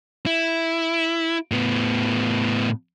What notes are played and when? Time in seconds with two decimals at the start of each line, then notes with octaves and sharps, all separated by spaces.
0.26 E4
1.51 A2 B3